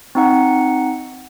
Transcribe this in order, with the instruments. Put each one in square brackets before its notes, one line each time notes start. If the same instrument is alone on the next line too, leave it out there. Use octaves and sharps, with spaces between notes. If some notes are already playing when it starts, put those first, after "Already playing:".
[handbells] C4 D#4 F#5